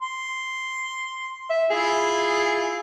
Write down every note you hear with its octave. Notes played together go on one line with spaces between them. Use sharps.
C6
E5
E4 F4 G#4